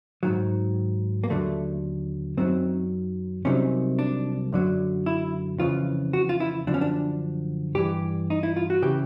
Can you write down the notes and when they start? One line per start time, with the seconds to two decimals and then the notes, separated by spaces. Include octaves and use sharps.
0.23 G#2 D#3 F#3
1.24 A#3
1.30 D#2 D3 F#3 A3
2.37 F#2 D#3 F#3 C4
3.45 C2 C3 D#3 F#3 C#4
3.99 D4
4.52 F#2 D3 F#3
5.06 E4
5.59 F2 C#3 E3 F4
6.13 F#4
6.29 F4
6.40 E4
6.67 F#2 D3 F3 D4
6.74 C#4
6.81 D4
7.75 G2 E3 G4
8.30 D#4
8.43 E4
8.56 F4
8.70 F#4
8.82 C#3 E3 G4